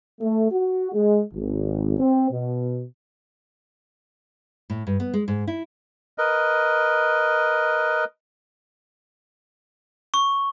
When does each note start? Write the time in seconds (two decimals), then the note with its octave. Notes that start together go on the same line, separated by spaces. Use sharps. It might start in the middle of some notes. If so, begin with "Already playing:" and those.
0.20 A3
0.52 F#4
0.93 G#3
1.33 G#1
1.98 C4
2.31 B2
4.70 A2
4.87 G2
5.00 B3
5.14 G#3
5.28 G#2
5.47 E4
6.18 A#4 B4 D#5
10.14 C#6